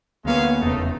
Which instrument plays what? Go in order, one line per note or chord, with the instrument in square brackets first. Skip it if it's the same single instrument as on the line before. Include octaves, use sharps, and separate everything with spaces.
[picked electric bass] D2 F#3 A#3 [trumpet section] G#3 C#4 F5 [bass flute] B3
[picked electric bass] F1 E2 C#3 [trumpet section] A3 D#4